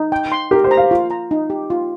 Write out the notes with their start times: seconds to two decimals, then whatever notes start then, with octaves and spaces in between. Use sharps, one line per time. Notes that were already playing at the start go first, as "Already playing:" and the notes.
Already playing: D#4
0.12 G5
0.32 C6
0.51 G4 A#4
0.64 C5
0.71 A#5
0.77 F5
0.91 F4
1.11 A#5
1.31 D#4
1.50 G4
1.70 F4